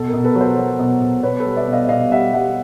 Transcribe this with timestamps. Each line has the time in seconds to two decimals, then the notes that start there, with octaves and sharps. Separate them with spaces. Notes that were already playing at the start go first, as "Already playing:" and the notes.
Already playing: B2 A4
0.08 A#4
0.13 B2
0.24 A4 B4
0.35 F#3
0.41 A#4 C5
0.57 F#3
0.79 B2
1.01 B2
1.23 B2 B4 C#5
1.40 A4 B4
1.45 G3
1.56 D5 E5
1.67 B2
1.73 D#5 F5
1.89 B2 D#5 F5
2.11 G3 E5 F#5
2.33 G3 E5 F#5